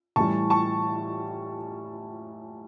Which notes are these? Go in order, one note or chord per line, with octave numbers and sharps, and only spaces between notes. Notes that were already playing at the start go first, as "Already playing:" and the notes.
A2 E3 G3 A5 C#6
A5 C#6